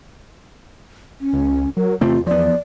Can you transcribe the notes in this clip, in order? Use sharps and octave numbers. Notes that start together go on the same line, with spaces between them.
C#4
C#2
F#3 A#4
E2 C3 A3 C4 F4
F3 B3 D5